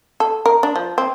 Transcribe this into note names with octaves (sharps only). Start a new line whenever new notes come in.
A4
A#4
D4
F3
C4